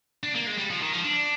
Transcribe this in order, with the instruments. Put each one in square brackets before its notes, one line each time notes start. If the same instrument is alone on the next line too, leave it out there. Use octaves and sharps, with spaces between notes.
[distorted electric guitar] D4
A#3
G#3
G3
F3
D#3
F3
D4